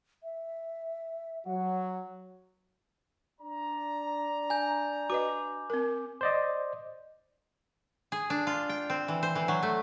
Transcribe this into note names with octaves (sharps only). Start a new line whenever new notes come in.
E5
F#3 F#5
D4 D5 A#5
G#5 G6
F#4 B4 D#5 D6
C4 A#4
C5 D5 D#5
G#4
D4
F4
G5
C4
E3
C5
E3
F#3
A3